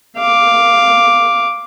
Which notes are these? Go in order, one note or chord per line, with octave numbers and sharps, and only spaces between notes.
F5 D6